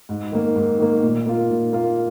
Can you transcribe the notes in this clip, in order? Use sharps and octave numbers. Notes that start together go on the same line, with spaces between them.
G#2
D#3 A#3
G#2
D#3 A#3
A#2
A#3 F4
A#2
A#3 F4